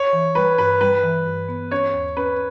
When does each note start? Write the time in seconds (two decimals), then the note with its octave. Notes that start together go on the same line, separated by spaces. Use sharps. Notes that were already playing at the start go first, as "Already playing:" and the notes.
Already playing: C#5
0.13 E3
0.35 G3 B4
0.58 G2 B4
0.81 G3 B4
1.03 E3
1.27 G2
1.49 B3
1.71 C#4 C#5
1.93 D#2
2.17 C#4 B4